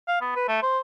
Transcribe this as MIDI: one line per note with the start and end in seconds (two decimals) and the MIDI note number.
0.08 0.21 77
0.21 0.34 59
0.36 0.47 71
0.48 0.61 57
0.62 0.79 72